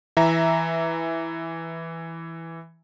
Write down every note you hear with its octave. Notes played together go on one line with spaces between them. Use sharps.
E3 E5 A#5